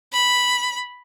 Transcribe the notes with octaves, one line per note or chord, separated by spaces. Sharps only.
B5